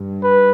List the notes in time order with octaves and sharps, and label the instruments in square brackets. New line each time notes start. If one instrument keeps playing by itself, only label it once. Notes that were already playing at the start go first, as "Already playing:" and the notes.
Already playing: [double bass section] G2
[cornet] B4